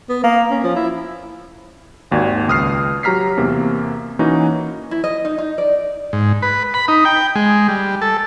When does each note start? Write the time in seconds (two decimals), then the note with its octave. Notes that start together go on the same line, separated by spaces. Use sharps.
0.09 B3
0.24 A#3
0.51 C#4
0.64 F3
0.76 E4
2.11 G#1 D#2 F#4 D5 G#6
2.48 C#2 D#6 F6 C7
3.03 F#3 G4 A#5 F6 B6 C7
3.38 E2 C3 A#3
4.19 E3 A#3 C#4 D#4 F#4
4.91 E4
5.04 D#5
5.25 D#4
5.38 D#4
5.58 D5
6.13 G#2
6.42 B4
6.74 B5
6.88 D#4
7.05 G5
7.35 G#3
7.68 G3
8.02 A4